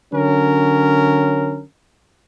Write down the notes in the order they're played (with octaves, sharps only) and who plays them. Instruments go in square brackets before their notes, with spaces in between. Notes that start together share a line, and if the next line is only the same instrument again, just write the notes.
[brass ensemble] D3 F#3 C#4 A#4